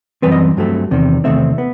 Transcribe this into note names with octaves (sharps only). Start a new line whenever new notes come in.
F#2 E3 G3 C4 B4
D#5
G2 F#3 A3 C4
E2 C3 D#3
E2 C3 D#3 A3 C4 E5
B3